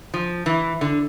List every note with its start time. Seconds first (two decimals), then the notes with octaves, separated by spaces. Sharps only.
0.14 F3
0.46 E3
0.81 D3